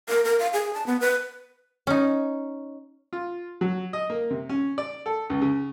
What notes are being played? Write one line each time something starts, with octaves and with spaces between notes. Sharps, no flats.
A#4
A#4
F5
G#4
A5
B3
B4
C#4 D#4
F4
F#3
D#5
A#3
C3
C#4
D5
A4
C#2
C#3